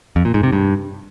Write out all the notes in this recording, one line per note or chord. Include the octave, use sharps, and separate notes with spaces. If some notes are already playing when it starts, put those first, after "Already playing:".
F2
A#2
G#2
C3
G2